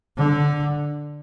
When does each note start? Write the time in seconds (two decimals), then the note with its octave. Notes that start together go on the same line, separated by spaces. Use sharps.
0.17 D3